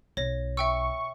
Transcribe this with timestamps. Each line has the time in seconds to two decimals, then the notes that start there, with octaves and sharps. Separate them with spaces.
0.17 B1 C#5 A#6
0.57 E5 G5 C#6 E6